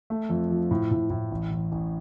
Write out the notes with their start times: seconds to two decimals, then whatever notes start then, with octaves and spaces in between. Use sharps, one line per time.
0.10 A3
0.29 F2
0.50 F3
0.71 A2
0.91 A2
1.10 A2
1.32 A1
1.51 A1
1.72 A1